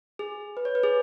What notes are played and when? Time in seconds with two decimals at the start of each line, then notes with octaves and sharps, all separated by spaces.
0.19 G#4
0.57 B4
0.65 C#5
0.75 B4
0.83 G#4